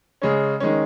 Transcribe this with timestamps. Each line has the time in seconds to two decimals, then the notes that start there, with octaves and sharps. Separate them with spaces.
0.22 C#3 G#3 C#4
0.60 D#3 G#3 C#4